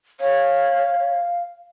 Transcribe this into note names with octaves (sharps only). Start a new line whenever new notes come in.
C#5 F5